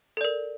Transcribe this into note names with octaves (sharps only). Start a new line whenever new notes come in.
A4 A#4 D5